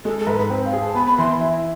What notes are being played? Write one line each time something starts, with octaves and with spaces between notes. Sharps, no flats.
G#3 A4
A4
G#2 B4
B4
C4 C5
F5
G#4
A5
B3 B5
B5
E3 C6
E4